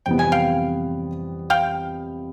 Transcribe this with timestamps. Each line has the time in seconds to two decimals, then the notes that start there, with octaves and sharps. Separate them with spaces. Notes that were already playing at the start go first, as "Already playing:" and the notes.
0.06 F2 C3 E3 G3 B3 G5
0.19 G#5
0.32 F5 G5
1.50 F5 G5